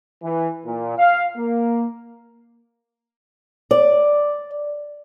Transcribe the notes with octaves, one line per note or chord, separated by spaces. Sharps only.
E3
A#2
F5
A#3
D5